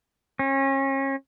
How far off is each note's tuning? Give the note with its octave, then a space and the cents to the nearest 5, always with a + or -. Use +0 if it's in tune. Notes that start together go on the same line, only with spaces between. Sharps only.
C#4 -35